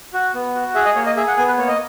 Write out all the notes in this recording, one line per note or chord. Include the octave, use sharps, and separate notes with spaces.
F#4
B3
F#4
G#4 E5
D#5
A#3 C#5
D#5
G#4 E5
F#5
B3 G#5
B4
A#3 C#5
D#5